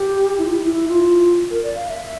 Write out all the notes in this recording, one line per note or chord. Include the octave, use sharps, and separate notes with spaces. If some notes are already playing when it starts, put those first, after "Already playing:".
Already playing: G4
E4
F4
E4
E4
F4
A#4
D5
F5
E5